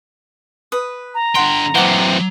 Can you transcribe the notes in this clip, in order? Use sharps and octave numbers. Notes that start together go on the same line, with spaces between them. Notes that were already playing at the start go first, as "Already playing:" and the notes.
B4 D#6
A#5
D3 F#5 G5 C6
E3 F#3 C4 C5 F#5 D6